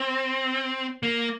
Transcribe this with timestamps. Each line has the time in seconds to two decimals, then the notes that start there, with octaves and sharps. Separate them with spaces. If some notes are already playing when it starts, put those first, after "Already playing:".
Already playing: C4
1.03 A#3